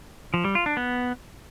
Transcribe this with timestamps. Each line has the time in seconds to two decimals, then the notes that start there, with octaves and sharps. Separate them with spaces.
0.34 F3
0.44 G3
0.55 F4
0.66 D4
0.77 B3